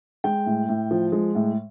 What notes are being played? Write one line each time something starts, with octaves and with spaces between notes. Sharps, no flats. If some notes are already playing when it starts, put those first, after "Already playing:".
G#3 G5
A2
A2
F3
G#3
A2